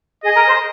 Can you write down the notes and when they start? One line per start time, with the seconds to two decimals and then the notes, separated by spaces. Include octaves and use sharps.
0.23 G#4 D#5
0.35 A#4
0.46 C5